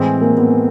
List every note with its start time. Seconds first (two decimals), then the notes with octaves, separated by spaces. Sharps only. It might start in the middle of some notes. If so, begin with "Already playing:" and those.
Already playing: A2 E3 G#3 C4
0.22 A#3
0.38 B3